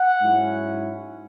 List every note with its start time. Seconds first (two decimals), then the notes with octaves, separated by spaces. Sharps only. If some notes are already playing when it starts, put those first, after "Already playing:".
Already playing: F#5
0.20 G#2 F#3 C#4 E4